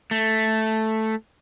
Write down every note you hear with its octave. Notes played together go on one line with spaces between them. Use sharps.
A3